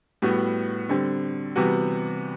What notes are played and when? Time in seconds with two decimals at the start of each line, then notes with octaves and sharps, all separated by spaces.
0.22 A2 G3 B3 F#4
0.89 D3 G3 C4
1.56 C3 E3 G3 B3 F#4